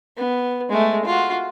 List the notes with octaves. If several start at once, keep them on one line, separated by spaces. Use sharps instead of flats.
B3
G#3 A3
F4 F#4